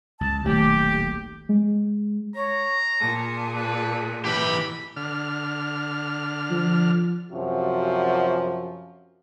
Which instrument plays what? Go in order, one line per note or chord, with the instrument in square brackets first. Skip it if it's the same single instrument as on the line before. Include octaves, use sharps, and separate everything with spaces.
[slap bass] C#2 [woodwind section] A5
[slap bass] D#1 B1 [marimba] D#3 A3 [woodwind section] G4
[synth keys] G#3
[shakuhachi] C#5 [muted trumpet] A#5
[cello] A#2 G#4 [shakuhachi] A5
[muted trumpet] B4 [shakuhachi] A5
[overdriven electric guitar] E3 G4 [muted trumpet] B5
[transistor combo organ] D3 F6
[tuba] F3
[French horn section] F#2 C3 F3 F#4